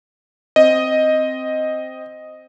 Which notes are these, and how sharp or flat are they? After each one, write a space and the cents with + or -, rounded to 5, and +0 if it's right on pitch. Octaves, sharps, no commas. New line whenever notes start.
C4 +0 D#5 +0